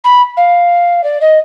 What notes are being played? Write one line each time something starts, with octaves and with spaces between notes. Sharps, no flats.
B5
F5
D5
D#5